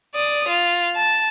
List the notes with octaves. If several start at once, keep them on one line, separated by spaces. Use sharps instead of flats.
D5 D#6
F4
A5